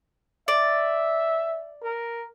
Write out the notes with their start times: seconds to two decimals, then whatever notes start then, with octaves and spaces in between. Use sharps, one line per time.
0.48 D5 E5
1.83 A#4